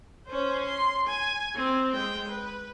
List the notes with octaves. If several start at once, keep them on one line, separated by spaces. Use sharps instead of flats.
C#4 C5
C6
G#5
C4
G#3 G5
B4